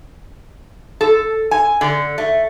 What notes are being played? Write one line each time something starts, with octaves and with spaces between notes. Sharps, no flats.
A4
G#5
D3
A3